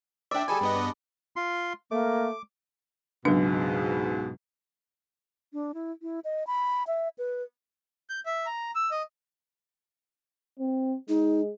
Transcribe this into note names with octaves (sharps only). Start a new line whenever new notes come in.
D4 D5 E5 G5
G3 G#4 A4 G#5 B5
G2 B3 D#5
D4
F4 C6
A3 A#3 D6
C#2 G#2 B2 F#3 B3 D4
D4
E4
E4
D#5
B5
E5
B4
G6
E5
A#5
E6
D#5
C4
G#3 D#4